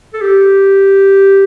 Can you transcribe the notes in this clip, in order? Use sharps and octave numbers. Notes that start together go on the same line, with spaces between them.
A4
G4